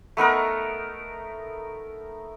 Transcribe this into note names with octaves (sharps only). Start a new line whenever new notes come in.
A3 B3 D#4 A#4